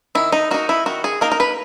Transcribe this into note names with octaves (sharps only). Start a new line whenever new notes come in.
D#3 E4
D#4
A#3 D#4 F#4
E4
D#3 F#4
G#4
A#3 D#4 A#4
A#4
B4